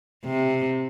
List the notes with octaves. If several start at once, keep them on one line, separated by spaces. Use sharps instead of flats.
C3